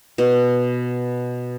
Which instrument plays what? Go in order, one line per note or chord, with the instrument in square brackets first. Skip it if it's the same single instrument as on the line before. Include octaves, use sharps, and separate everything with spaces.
[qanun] B2